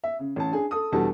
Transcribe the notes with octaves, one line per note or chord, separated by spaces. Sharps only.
E5
C#3
A1 A5
D4 G#4
A4 D#6
E2 B2 G3 D4 A4 A5